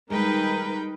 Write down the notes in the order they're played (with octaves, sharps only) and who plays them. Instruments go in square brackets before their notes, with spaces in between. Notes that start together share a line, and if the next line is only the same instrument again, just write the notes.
[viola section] D#3 D#4 G5 [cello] G3 B4 [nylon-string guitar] G#3 [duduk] A#4